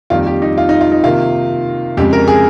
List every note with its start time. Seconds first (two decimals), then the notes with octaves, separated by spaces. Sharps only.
0.10 F2 D#3 G3 A#3 F4
0.27 G4
0.42 D#4
0.58 F4
0.69 D#4
0.81 F4
0.92 D#4
1.04 C3 D#3 A#3 F4
1.97 F2 C#3 G#3 G4
2.13 A#4
2.28 G#4